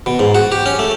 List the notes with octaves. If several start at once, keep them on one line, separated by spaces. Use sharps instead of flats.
B2
G#2
F#4
G4
C#4
A3